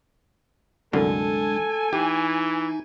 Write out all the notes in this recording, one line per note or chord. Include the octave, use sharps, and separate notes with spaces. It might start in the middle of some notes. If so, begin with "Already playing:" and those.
C2 F#2 D3 G#3 D4 A4 G#5
E3 D#4 G4